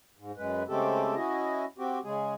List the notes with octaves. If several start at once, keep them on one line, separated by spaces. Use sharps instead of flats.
G#2
F#2 G#3 B4
C#3 G#3 A3 C4 G4 A4
C#4 E4 F#4 D#5
C4 F#4 G4
C#3 G#3 G#4